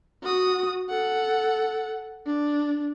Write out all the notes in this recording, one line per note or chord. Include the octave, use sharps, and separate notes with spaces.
F#4 D#6
A4 F#5
D4